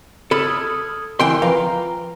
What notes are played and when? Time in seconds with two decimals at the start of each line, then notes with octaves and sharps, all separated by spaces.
0.31 A4 B5 D#6 F6 G#6
1.20 E3 A#4 G5 C6
1.42 F3 B4 F5 A#5